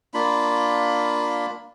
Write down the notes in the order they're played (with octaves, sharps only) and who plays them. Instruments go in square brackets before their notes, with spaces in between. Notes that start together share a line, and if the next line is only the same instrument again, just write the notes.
[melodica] A#3 D4 F4 B5